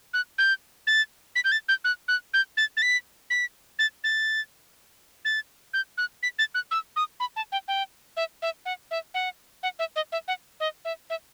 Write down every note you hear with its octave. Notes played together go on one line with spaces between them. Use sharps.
F#6
G6
A6
B6
G6
A6
G6
F#6
F#6
G6
A6
A6
B6
B6
A6
A6
A6
G6
F#6
B6
A6
F#6
E6
D#6
B5
A5
G5
G5
E5
E5
F#5
E5
F#5
F#5
E5
D#5
E5
F#5
D#5
E5
E5